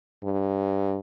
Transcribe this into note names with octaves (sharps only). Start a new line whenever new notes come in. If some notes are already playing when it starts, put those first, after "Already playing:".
G2